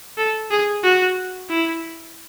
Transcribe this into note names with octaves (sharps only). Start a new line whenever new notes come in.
A4
G#4
F#4
E4